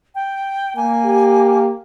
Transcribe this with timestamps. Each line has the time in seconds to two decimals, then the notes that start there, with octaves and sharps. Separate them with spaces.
0.15 G5
0.76 A#3 G#5
1.05 G4